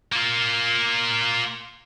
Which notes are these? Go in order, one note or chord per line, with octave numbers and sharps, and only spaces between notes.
A#3 F4